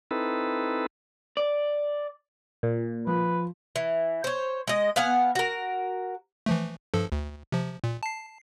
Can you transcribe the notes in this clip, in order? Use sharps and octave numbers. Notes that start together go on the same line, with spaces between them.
C4 D#4 E4 A4 B4
D5
A#2
F3 B4
E3
C5 C#5
G#3 D#5
B3 F5 F#5 G#5
F#4 A#4
E3 F3 A3
G2 F3 A4
D2
C3 F3
A#2
A5 C7